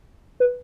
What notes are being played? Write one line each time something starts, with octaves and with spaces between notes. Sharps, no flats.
B4